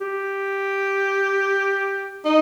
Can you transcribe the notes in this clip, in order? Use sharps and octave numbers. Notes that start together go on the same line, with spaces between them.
G4
D#4